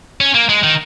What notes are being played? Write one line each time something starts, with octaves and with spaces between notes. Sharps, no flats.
C#4
A#3
G#3
D#3